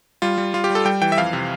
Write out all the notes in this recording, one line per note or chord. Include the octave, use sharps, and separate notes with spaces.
G3 F4
G3
G3 F4
G4
G3
A4
G3 G5
E3 G5
E5
F2 F5
C3